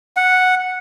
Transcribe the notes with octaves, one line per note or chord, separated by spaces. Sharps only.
F#5